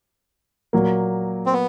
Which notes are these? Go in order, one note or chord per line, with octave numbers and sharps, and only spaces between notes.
A#2 F#3 A#3
C4
B3